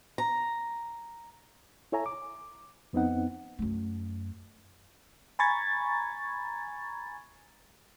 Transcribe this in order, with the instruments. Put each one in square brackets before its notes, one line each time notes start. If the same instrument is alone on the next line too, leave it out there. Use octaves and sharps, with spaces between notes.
[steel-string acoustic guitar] A#5
[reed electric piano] E4 A4 C#5 E5 G#5 A#5
D6
F2 B3 C4 D#4 F#5
[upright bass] F#2 A3
[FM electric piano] G#5 A#5 B5 C#6 G#6 A6